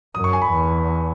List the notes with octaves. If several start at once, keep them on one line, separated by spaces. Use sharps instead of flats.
F#2 D#6
C#6
G#5
B5
E2